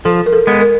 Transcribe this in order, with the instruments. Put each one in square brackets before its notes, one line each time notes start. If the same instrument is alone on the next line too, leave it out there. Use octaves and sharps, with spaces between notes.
[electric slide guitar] F3 [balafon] A4
[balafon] A#4
A4
[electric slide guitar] G#3 B3
[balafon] A#4